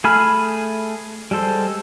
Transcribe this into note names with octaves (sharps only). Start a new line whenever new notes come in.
A3 G#4 G#5 B5 F6
G3 G#3 A4 C5